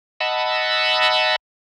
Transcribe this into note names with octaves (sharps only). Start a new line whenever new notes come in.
D#5 F#5 A5 B5 E6